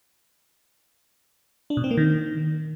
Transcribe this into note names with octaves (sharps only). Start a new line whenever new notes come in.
D4
B2
C4
A#3
D#3